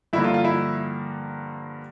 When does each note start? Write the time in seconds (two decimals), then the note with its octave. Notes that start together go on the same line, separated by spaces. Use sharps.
0.13 G2 D3 F3 A#3 E4
0.24 F4
0.34 F4
0.44 E4